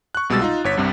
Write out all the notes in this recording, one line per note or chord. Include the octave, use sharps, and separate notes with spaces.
C#6 F#6
C2 B2 G3 G#3 E6 A6
D#4 F4
G1 C#5 B6
C2 G2 C3